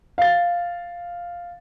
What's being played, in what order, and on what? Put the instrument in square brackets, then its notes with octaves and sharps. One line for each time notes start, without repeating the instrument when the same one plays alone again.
[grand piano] F5 A6